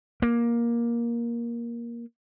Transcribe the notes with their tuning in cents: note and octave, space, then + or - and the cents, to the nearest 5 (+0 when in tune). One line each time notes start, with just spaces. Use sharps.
A#3 +15